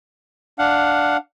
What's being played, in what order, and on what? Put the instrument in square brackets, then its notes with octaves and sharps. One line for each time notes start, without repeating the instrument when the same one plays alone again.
[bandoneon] D4 F5 F#5